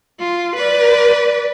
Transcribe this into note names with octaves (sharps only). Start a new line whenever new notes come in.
F4
B4 D5